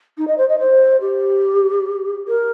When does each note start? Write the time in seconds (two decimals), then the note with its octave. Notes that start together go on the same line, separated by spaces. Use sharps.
0.18 D#4
0.28 D#5
0.38 C5
0.49 D#5
0.59 C5
1.01 G4
2.28 A#4